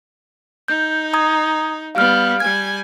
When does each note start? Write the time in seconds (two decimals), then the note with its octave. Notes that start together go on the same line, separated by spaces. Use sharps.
0.68 D#4 G6
1.13 A#5 D#6 G#6
1.95 G3 B3 F5 F6
2.40 G3 G#5 G#6